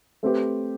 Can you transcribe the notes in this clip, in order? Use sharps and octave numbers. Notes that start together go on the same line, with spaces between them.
A3 C4 G4 B4